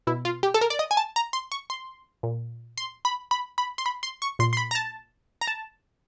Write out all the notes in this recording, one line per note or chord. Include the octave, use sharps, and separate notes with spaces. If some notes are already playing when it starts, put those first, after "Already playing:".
B2 E4
F4
G4
A4
A#4
D5
D#5
G#5
A5
A#5
C6
C#6
C6
A#2
C6
B5
B5
B5
C6
B5
C6
C#6
A#2 C6
C6
B5
A#5
A5
A#5
A5